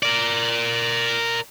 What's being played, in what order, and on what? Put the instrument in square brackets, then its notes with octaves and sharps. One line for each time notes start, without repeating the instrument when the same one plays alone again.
[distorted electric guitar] A#4 D5